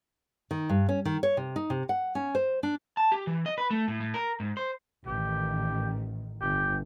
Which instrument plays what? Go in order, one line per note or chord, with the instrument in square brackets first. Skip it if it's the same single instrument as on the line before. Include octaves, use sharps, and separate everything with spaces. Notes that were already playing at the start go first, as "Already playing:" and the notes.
[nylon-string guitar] D#3
G2
C#4
D#3
C#5
C3
D#4
C3
F#5
C#4
C5
D4
[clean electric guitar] A5
G4
E3
D#5
B4
A3
A2
A2
A#4
G#2
C5
[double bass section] A1 D#3 [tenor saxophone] G4
[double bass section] G1 [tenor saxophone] G4